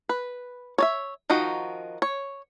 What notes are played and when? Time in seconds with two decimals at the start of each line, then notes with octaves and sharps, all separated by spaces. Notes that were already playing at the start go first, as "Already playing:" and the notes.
0.09 B4
0.78 C#5 D5 E5
1.30 D#3 F3 D#4 F#4
2.02 C#5